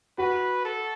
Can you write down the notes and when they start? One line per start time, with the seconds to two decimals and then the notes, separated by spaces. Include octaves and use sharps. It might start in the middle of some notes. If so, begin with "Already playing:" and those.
0.18 F#4 B4
0.65 A4